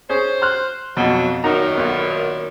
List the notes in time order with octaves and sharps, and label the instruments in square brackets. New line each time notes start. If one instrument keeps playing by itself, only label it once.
[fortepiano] C#4 G#4 [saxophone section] C5
[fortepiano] C6 F6 F#6
[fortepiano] F2 B2 [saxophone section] F#3
[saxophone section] F#2 A#2 D#3 [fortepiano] D#4 F#4 A#5
[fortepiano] B1 B3 F6